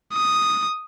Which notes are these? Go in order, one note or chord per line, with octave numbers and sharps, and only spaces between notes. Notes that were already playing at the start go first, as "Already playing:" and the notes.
D#6